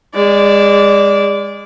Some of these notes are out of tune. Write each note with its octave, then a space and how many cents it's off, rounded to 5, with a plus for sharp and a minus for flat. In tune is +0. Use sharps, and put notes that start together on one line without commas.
G#3 -30 D5 -15